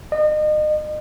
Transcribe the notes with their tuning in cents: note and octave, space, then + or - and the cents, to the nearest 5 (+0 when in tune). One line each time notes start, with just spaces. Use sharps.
D#5 -35